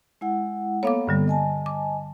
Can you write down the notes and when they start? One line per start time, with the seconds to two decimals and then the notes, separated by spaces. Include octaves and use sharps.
0.21 G#3 E4 F#5
0.83 A#3 B3 A4 C#5 F5 D6
1.07 G2 D3 G3
1.28 D#5 G#5 A5
1.66 D6